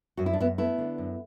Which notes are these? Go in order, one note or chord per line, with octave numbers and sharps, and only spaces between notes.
F#2 F#4
E4
D4
F#2 B3 E4
A3 B3 E4
D3
F#2